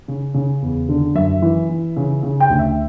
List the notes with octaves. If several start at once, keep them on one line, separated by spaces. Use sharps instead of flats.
C#3
C#3
E2
D3
F#2 E5
E3
E3
C#3
C#3
G5
D2
E5